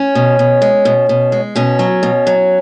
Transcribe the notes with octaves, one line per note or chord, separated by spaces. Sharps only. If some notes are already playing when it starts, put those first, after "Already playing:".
Already playing: C#4
B2
B2
G#3
B2
B2
G#3
B2 C#4
F#3
B2
F#3